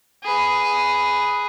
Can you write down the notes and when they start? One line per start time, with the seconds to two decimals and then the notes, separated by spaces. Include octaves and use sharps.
0.23 G#4 B4